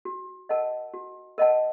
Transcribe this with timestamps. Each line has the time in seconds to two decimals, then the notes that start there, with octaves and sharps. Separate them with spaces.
0.05 F#4
0.49 A#4 D#5 F#5 A5
0.94 F#4
1.38 A#4 D#5 F#5 A5